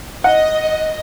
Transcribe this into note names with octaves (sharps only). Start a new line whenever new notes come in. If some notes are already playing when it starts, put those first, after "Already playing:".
D#5 F#5